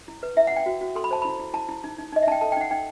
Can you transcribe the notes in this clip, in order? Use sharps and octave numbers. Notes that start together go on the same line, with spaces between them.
E4
B4
E4 E5
F#5
E4 G5
F#4
F#4
A4 C6
B5
C5 A5
E4 B5
E4
E4 A5
E4
D#4
D#4
D#4 D#5
E5
D#4 G5 A5
A4 A5
G5
D#4 F#5
D#4 G5